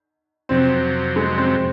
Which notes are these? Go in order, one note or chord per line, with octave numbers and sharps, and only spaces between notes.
F2 C3 F#3 C4
G#3
C4